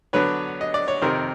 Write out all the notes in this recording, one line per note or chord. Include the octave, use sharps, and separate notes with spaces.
D3 F#3 B3 D4 B4 C#5
D#5
D5
C#5
F2 C3 D#3 A#4 C5